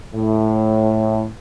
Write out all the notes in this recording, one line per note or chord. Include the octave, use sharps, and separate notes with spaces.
A2